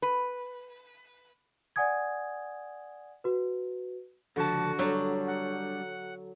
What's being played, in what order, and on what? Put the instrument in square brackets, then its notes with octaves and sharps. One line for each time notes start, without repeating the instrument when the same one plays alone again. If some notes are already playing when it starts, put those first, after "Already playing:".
[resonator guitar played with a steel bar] B4
[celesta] D5 F#5 G#5 D#6 G#6
F#4 B4
[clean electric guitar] C#2 F3 A5 [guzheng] D3 [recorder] F#4
[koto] F#3 [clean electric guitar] G3 D4
[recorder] F#5